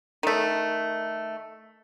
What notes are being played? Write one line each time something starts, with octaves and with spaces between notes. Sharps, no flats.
D#3 A3